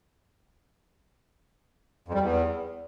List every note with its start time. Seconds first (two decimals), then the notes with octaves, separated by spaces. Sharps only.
2.08 F2
2.14 G3
2.20 E2